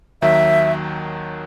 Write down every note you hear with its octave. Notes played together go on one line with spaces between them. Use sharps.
D#2 D#3 F#3 E5